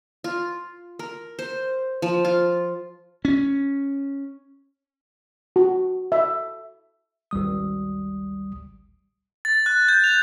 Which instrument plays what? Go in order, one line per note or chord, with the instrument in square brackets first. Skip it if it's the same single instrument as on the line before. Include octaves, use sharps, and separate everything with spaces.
[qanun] F4
A#4
C5
F3
F4
[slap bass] C#4
[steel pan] F#4
E5
[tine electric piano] G#1 D2 G3 D#6
[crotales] A6
F#6
G6
F7